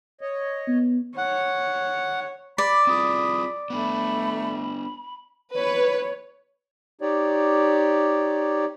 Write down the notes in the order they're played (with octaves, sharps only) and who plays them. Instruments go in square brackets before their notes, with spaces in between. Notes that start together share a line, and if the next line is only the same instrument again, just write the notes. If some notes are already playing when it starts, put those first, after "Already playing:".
[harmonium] C#5 D#5
[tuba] B3
[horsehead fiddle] C#5 [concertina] F#5
[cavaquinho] D5 [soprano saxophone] B5
[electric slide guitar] C4 F4 G#4 [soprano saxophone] B5 [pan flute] D#6
[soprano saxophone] A3 [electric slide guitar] B3 D4 [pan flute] B5
[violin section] B4 [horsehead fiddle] C#5
[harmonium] D#4 G4 C#5 D5